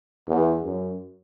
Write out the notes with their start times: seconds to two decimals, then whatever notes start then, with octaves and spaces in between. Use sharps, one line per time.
0.28 E2
0.64 F#2